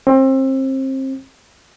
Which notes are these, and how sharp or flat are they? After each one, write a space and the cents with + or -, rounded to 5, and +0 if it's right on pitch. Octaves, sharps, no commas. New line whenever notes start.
C4 +30